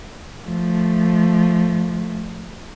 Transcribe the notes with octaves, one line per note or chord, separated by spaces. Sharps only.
F3 A3